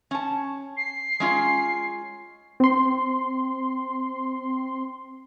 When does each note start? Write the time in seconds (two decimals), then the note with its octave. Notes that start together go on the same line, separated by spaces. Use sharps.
0.11 C#4 A5
0.77 C7
1.20 G#3 C#4 F4
2.60 C4 C6